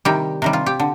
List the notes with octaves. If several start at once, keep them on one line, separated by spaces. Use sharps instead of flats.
C3 D#3 G3 G4
C3 D#3 G3
F4
G4
D3